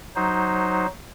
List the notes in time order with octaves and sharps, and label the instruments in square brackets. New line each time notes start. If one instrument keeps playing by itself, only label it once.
[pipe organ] F#3 D#4 C5